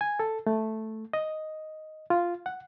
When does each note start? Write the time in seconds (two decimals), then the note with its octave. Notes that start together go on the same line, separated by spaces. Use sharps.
0.01 G#5
0.20 A4
0.47 A3
1.13 D#5
2.10 F4
2.46 F#5